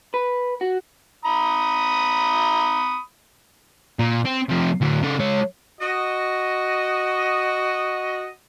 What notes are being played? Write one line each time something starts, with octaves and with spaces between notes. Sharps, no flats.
B4
F#4
A#5 B5 D#6
A#2
C4
C3 F3
D2 F#3
C#3 A4
G#3 C#5
F#4 D#5